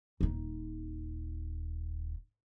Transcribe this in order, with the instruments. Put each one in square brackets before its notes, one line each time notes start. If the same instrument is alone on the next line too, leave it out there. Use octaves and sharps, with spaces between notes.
[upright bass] D#1 D#4